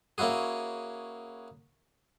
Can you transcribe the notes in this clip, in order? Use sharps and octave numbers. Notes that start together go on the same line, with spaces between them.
A#3 C#4 E4 F#4 G#4